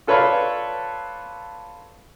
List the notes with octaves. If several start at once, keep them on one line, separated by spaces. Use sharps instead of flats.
F4 A4 B4 C#5 D5 F5